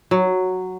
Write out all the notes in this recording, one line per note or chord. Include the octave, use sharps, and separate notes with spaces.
F#3